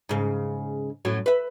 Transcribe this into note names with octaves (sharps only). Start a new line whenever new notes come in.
G#2 C#3
F#2 A2 F#3
B4 E5